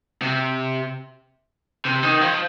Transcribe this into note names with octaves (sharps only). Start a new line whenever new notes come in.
C3
C3
D#3
F3